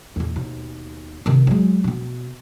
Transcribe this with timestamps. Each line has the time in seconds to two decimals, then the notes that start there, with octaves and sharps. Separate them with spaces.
0.16 E2 A#2
0.36 D#2 B2
1.26 C3 D#3
1.47 F#3 G#3
1.84 B2 B3